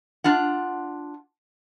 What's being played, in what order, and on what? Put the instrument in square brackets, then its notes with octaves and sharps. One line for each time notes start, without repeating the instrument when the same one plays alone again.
[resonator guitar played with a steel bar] D4 F4 F#5